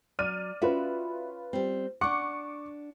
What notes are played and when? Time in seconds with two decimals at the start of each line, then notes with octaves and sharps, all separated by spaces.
0.19 F#3 D5 F6 D#7
0.62 C#4 F4 F#4 B4 D5 E5
1.53 G3 C4
2.01 D4 F#5 C#6 D6 C#7